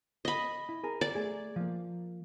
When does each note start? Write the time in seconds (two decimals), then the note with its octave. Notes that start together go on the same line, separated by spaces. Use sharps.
0.25 D#5 B5
0.69 E4
0.84 G#4 A#4
1.01 D5
1.15 A3 G#4
1.56 F3 A#3